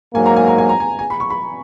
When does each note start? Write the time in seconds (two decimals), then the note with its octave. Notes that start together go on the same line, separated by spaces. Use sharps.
0.14 G#2 F#3 A#3 G#5
0.26 A#5
0.36 G#5
0.48 A#5
0.58 G#5
0.69 A#5
0.80 G#5
0.99 G#5
1.10 B5
1.20 C#6
1.30 B5